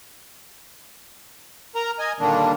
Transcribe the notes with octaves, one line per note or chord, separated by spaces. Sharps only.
A#4 A#5
D#5 G#5
A#2 D3 D#3 G3 A#3 D4